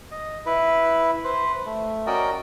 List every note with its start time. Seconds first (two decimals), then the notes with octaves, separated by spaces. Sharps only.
0.11 D#5
0.46 E4 B4
1.24 B4 C5
1.65 A3
2.07 C#4 F#4 A#4 D5 D#5 G5